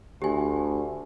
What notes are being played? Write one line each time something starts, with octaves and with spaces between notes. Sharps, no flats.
D2 G4 G#5